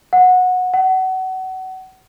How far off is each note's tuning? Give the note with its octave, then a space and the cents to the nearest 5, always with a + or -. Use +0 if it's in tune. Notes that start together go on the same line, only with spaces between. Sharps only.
F#5 -15
F#5 +25